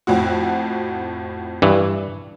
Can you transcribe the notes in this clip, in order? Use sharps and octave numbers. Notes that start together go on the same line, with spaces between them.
F2 A2 F#4
G2 E3